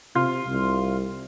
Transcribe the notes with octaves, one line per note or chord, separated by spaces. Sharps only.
C3 F4
C2